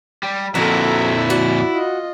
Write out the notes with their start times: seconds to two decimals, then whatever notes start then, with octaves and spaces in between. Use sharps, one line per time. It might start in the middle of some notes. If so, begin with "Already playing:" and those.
0.23 G3
0.55 F2 A#2 E4 F#4 A4 A#5
1.30 F#4 D5
1.73 F4 D#5